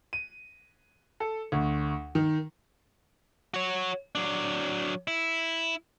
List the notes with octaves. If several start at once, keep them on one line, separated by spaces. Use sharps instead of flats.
D#7
A4
D2
D#3
F#4 C#5
F#3 D4
E4